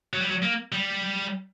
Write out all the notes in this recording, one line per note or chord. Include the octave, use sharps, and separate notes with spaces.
F#3
G3
F#3
A#3
G3